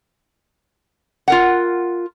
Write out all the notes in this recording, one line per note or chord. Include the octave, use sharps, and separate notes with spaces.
F4 A#4 F#5